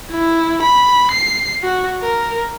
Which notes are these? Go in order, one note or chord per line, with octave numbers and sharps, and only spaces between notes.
E4
B5
C7
F#4
A#4